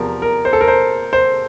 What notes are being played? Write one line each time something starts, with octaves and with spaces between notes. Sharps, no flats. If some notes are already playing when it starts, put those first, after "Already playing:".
Already playing: E2 C3 F3 A#4
A#4
C5
A4
A#4
C5
C5